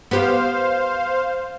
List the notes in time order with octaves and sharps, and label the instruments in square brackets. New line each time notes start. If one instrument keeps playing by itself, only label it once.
[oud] B3 G4 [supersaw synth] C5 F5